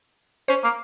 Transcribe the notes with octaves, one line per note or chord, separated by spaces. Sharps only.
C#4 C5
A#3